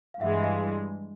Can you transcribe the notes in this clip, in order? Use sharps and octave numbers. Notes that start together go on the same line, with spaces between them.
F5
G2 E3 G#3 E5 F#5
D#5 F5